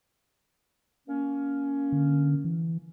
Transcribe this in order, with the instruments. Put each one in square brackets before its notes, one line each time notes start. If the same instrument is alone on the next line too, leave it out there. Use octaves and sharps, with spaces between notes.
[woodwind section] A#3 C#4
[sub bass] D3
E3